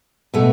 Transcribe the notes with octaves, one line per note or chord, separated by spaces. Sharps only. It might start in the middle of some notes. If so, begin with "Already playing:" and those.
B2 A3